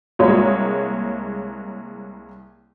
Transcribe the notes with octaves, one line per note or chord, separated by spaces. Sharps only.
C2 G#3 A#3 C#5